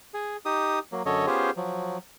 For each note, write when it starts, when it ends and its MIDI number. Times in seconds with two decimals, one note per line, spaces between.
0.14 0.37 68
0.45 0.79 63
0.45 0.79 67
0.45 0.79 87
0.92 1.02 54
0.92 1.02 58
1.06 1.26 42
1.06 1.26 50
1.06 1.26 69
1.06 1.26 73
1.06 1.26 75
1.27 1.51 59
1.27 1.51 61
1.27 1.51 65
1.27 1.51 67
1.27 1.51 68
1.27 1.51 72
1.56 1.98 53
1.56 1.98 54